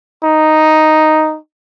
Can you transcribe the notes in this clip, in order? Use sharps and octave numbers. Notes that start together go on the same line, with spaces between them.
D#4